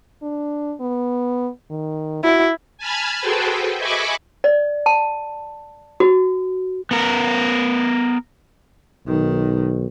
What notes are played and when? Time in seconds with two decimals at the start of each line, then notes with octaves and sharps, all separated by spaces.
0.23 D4
0.80 B3
1.70 D#3
2.24 E4 F#4
2.78 G#5 A5 B5 F6 G#6
3.21 F#4 G#4 A4 B4 C5 G5
3.78 D#5 E5 G#5 B5 C#6 D6
4.44 D5
4.86 A5
6.00 F#4
6.91 B3 A#4
9.07 B1 D#3